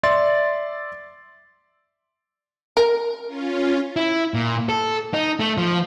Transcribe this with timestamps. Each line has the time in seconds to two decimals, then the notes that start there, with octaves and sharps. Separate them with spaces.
0.03 D5 E5 C6 A6
2.77 A#4
3.27 C#4 F4
3.96 E4
4.34 A#2
4.69 A4
5.14 D#4
5.40 A3
5.58 F3